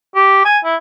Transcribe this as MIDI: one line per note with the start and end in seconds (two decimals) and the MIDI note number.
0.15 0.43 67
0.45 0.58 80
0.64 0.76 64